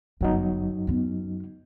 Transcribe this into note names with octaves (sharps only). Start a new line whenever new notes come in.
D1 G1 F#2 F#3 D#4
B3 C#4